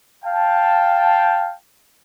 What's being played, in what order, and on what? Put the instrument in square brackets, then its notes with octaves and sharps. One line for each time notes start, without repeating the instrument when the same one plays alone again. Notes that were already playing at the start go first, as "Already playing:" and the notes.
[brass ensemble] F5 G5 A5